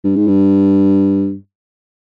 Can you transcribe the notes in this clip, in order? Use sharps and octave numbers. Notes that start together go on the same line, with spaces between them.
G2
G#2
G2